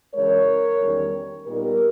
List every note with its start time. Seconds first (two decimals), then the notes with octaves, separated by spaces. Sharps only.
0.14 C#3 E3 G#3 A#4 C#5
0.80 E2 D#3 G3 C#4
1.47 A#2 G3 B3 D#4 G4 A#4